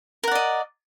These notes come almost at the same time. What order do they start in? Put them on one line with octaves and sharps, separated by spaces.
A#4 F#5 D5 D#5